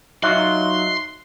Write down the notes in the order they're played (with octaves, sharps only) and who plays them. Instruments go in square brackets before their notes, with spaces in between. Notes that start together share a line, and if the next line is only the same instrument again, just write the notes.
[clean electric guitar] F#3 F4 F#4 [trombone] D#4 [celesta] E5 F#6 [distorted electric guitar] C6